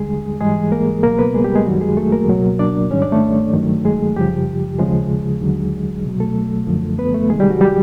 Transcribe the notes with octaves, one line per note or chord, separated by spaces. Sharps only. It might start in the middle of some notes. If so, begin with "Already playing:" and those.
Already playing: D#2 D3 G3 G#3 G#4
G#2 E3 G3 G#3 G#4
A#3 A#4
C#2 B2 F#3 A#3 A#4
B3 B4
G#3 G#4
G3 G4
G#3 G#4
F#2 D#3 F#3 G3 F#4
G#3 G#4
A3 A4
A#3 A#4
C#2 B2 F#3
D4 D5
G#2 D#3 G3 C#4 C#5
D4 D5
A3 A4
G2 D#3 F#3
G#3 G#4
F#2 C#3 F3 G3 G4
D#2 C#3 F3 G#3 G#4
D#2 D3 F#3
C2 B2 F#3
A3 A4
F#2 D3 F3
B3 B4
A3 A4
C2 C3 D#3 G3 G#3 G#4
G3 G4
F#3 F#4
G3 G4